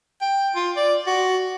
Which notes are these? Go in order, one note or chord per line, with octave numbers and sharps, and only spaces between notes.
G5
F4
D5
F#4